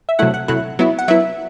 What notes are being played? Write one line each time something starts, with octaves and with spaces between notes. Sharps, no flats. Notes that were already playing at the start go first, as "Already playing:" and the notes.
E5
C3 F#3 A3 E4 F#5
F#5
C3 F#3 A3 E4 F#5
F#3 B3 E4
F#5
F#3 B3 E4 E5